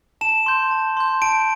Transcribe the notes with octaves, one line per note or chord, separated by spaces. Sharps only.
A5 E7
C6 G6
A5
C6 G6
A5 D7